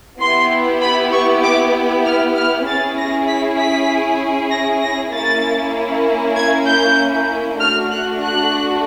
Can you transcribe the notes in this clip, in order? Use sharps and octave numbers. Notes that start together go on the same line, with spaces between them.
B3 E4 G4 C6
B5
C#6
D6
F6
F6
C#4 E4 G#4 A6
A#6
B6
B6
A#6
A#6
A#3 C#4 E4 A6
G#6
G6
A3 D4 F#4 F6
F#6
F#6